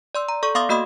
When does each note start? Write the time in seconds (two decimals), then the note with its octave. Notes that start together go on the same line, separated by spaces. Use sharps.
0.15 D5 C6 E6
0.29 A#5
0.43 A4 D5 C#6
0.55 B3 F5 C6 D6 D#6 A6
0.69 A#3 F#4 D#5 B5 C6 D#6